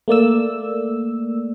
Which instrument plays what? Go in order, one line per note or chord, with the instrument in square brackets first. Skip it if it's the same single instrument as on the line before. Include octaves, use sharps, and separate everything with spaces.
[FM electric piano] A3 A#3 D5 E6